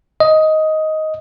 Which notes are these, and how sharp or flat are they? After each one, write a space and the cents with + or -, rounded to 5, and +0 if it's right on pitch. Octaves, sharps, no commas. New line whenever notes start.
D#5 +10